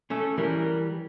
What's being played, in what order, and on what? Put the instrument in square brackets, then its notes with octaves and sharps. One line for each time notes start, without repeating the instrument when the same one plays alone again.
[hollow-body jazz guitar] A3 C#4
[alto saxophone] A4
[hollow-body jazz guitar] E3 G3 [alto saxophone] A#4